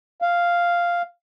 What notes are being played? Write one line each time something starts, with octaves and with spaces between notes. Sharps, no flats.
F5